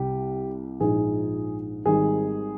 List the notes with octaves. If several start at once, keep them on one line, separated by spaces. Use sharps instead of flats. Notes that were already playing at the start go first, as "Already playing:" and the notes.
Already playing: C2 C3 G3 G4
A#1 G#2 F3 G#4
G#1 G#2 D#3 G3 G#4